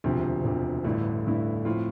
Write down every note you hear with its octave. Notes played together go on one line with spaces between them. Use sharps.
E1 D2 C3 F3
E1 D2 C3 F3
A1 G2 D3 A3 E4
A1 G2 D3 A3 E4
A2 F3 C4 F4